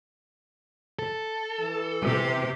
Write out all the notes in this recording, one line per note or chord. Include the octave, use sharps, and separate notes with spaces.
A4
E3
C3 G4